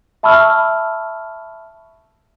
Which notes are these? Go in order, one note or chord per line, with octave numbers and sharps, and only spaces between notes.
E5 A5 B5 C#6 E6 F6